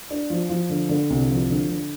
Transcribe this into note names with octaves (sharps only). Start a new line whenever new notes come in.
D4
F3
F3
D3
D3
C2
F3
D3
D3